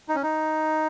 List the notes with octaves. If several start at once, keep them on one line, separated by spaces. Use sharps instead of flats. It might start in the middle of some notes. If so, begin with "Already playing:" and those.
D#4
C#4
D#4